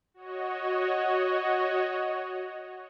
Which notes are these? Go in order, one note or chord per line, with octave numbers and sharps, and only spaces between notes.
F#4 C#5 D#5